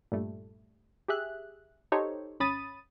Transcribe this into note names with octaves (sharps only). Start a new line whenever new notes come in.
G2 A#2 G3 A3
G4 G#4 E5 F#6
D#4 G4 A4 C5 C#5
G#1 C#4 B5 D#6 A6 D#7